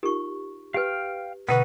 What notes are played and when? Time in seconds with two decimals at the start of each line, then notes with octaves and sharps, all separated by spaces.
0.03 D#4 F4 G4 A#4 C#6
0.74 G4 B4 F5 G5 F6
1.49 B2 D3 B3 D#4 B4 F#5 C#6 E6